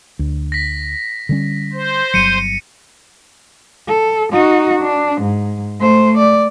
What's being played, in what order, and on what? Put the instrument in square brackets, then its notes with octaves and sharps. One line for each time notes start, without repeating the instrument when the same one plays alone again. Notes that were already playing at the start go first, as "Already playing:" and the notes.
[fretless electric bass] D2
[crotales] A#6 B6
[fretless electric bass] D3 G3 C#4
[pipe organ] C5
[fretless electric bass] G1 F#3 [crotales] C#7 D#7
[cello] A4
D#4 F#4
D4
G#2
A3 C5
D5